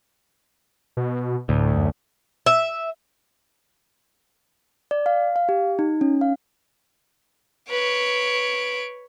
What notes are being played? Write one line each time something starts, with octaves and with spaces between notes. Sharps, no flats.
B2
D2 A2
F#2
E5
D5
F5
F5
G4
D#4
C#4
F5
B4 C#5 D7